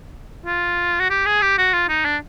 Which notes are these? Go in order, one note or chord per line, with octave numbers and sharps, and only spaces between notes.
F4
F#4
G4
G#4
G4
F#4
F4
D#4
D4